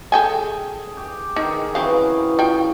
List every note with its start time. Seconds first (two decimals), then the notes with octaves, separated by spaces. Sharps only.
0.12 G#4 A4 G5 G#5
0.97 G4
1.36 D#3 D#4 G#4 A#4
1.75 C#3 E3 F#3 C4 F5
2.39 F4 G5